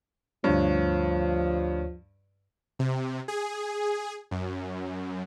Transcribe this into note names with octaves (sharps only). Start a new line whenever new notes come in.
D2 G2 F3 C#5
C3
G#4
F#2